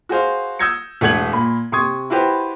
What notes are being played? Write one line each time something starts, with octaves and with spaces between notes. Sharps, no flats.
F#4 G#4 C5 F5
D#6 E6 G6 G#6 A#6 C#7
E1 A3 D4 F#5 G#6 F#7
A#2 B5
C3 C6 C#6 D#6 G#6
E4 F#4 G4 B4 C5